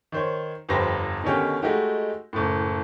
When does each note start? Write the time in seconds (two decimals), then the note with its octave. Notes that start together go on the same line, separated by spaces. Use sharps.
0.12 D#3 C5 C#5
0.69 G1 F2 G4 B4 C5 A#6
1.24 B2 D3 D#3 C#4 G4
1.62 G#3 A3 D#4 F#4 G4
2.33 F#1 A2